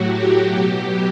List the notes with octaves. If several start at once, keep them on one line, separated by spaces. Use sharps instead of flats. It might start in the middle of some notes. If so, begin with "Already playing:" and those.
Already playing: A2 F#3 F#4 G4
B2 F#3 G4